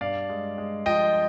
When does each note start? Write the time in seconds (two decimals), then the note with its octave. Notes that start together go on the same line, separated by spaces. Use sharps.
0.01 G2 D5 F5
0.29 G#3
0.58 G#3
0.86 F3 D#5 G5